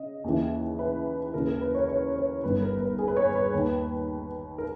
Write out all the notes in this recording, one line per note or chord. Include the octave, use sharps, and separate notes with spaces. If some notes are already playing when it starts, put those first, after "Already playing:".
Already playing: C#3 D#5
D#2 C#3 E3
B4
D#2 C#3 E3 A#4
A#4
B4
C#5
C#5
C#5
G1 G2 D#3 B4
A#4
A#4
G#4
B4
C#5
B4
D#2 D#3
A#4